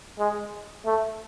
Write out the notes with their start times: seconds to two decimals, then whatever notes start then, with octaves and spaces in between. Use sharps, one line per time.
0.19 G#3
0.86 A3